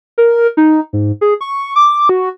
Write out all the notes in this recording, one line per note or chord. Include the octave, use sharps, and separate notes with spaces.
A#4
D#4
G#2
G#4
C#6
D6
F#4